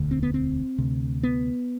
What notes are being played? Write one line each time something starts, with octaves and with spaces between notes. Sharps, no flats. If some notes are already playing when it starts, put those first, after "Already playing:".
Already playing: E1 D2 D3
C4
B3
C4
D2 C3
B3